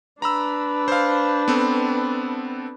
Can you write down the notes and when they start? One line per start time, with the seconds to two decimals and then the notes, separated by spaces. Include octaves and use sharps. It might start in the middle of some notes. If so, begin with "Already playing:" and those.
0.22 D4 B4 A#5 B5 E6
0.88 C5 F5
1.48 B3 C4 A4